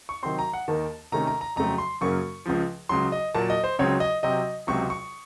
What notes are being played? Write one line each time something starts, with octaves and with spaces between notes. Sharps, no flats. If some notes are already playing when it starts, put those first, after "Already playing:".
C#6
C3 D#3 F#3 C4 C6
A#5
F#5
D#2 D#3 A#3 A5
C3 D#3 A3 C#4 A#5
A#5
A#5
F2 C#3 F#3 A3 C4 A#5
C6
F#2 C#3 F#3 A#3 C#4 C#6
C#2 C#3 F3
C#2 C#3 F#3 C6
D#5
A#2 F#3 A#3 A5
D#5
C5
C#2 C#3 F#3 C4 C#5
D#5
C3 F#3 C4 D#5
C#2 C3 F#3 C4 C#6
C#6